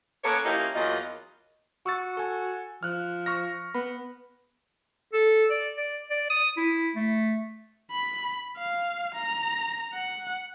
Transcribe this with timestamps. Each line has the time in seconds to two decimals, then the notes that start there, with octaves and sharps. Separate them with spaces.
0.23 A#3 B3 C#4 A4 C#5
0.45 F3 A#3 C#4 D#4 E4 G4
0.75 E2 F#3 A#3 D#4 F4 D#5
1.86 F#4 C#6 E6 A6
2.17 A4 G#5
2.83 F3 F6 F#6
3.26 C#6 F6 A#6
3.75 B3 B5
5.13 A4
5.50 D5
5.77 D5
6.10 D5
6.30 D#6
6.57 E4
6.95 A3
7.91 B5
8.59 F5
9.15 A#5
9.94 F#5